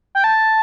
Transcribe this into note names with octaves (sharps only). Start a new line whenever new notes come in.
G5
A5